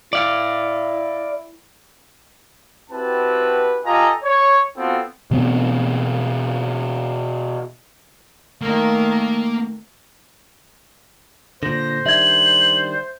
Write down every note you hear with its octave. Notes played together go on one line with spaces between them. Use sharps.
E4 D5 F5
C4 E4 F#4 G4 B4 A5
F4 G4 A4 D#5 G#5 A#5
C#5
B3 C4 F4 F#4 A4
B2 E3 B3 C4
D#3 A3 A#3 A#4
A#2 D3 C5 A#6
D#3 G3 D4 E5 G#6 F#7